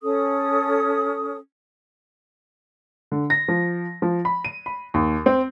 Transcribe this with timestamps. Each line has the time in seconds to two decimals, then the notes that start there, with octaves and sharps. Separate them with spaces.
0.03 C#4 A4 D#6
3.12 D3
3.30 A#6
3.48 F3
4.02 F3
4.25 B5
4.45 D#7
4.66 B5
4.94 D#2
5.26 C4